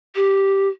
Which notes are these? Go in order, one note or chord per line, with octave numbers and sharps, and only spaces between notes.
G4